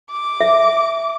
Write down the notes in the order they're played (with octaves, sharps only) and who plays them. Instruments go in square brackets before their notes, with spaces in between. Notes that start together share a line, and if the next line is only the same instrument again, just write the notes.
[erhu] D6
[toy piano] E5